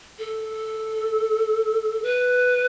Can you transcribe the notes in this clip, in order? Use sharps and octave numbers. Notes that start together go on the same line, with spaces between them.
A4
B4